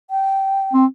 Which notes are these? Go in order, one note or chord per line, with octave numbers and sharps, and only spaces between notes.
G5
C4